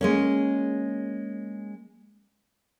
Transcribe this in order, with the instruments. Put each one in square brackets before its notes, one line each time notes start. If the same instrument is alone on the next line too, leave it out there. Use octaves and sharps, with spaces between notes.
[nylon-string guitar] G#3 A#3 C#4